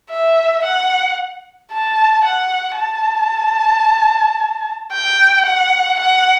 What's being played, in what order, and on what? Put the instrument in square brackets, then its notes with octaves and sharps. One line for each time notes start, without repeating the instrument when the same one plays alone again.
[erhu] E5
F#5
A5
F#5
A5
G5
F#5
F#5